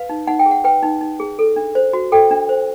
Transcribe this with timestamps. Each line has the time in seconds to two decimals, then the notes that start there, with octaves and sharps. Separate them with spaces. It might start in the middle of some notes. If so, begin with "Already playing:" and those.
Already playing: B4 F5
0.09 D#4
0.28 D#4 F#5
0.39 G5
0.46 G#4
0.51 F#5
0.64 B4 G5
0.83 D#4
1.01 D#4
1.20 G#4
1.39 A4
1.56 D4
1.75 C5
1.93 F#4
2.12 A4 G5
2.31 D4
2.49 C5